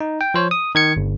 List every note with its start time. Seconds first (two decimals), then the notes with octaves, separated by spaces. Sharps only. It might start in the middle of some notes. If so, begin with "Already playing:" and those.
0.01 D#4
0.21 G5
0.34 F3 C5 C#5
0.51 D#6
0.75 D#3 G#6 C#7
0.96 G1